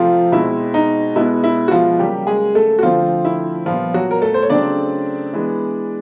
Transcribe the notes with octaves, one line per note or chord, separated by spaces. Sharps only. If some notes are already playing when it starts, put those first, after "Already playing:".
Already playing: C3 F3 A3 C4 F4
B2 G#3 C4 E4
D#4
B2 G#3 B3 E4
E4
F#4
F3 F4
C#3 F#3 G3 A#3 G4
G#3 G#4
A3 A4
F#4
D3 F3 A3 C4 F4
E4
A#2 F3 G3 B3 F4
F#3 F#4
A#4
A3 A4
C5
C#5
C#3 F#3 A3 C4 D4 D5
E3 G#3 B3